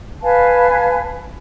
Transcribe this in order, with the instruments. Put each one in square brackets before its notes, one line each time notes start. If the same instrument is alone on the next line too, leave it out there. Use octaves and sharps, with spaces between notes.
[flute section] B4 F5 G#5 A5